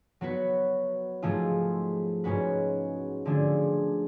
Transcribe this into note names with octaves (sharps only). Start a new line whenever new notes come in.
F#3 B3 F#4 B4
G#2 F3 A3 F4 G#4
G#2 G#3 C#4 F#4 B4
D3 F3 A3 D4 G#4